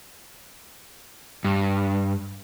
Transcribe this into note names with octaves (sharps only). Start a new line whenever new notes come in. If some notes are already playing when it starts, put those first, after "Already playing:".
G2